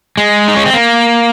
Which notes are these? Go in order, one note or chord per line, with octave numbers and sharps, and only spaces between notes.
G#3
D#4
C#4
C4
A#3